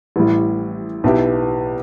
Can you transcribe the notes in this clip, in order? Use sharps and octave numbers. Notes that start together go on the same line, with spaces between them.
A1 A2 G3
B1 B2 B3 E4 G4